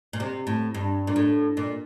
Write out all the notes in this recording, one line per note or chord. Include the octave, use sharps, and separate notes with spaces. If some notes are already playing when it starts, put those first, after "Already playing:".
A#2
C3
A2
G2
A#2
A2
A#2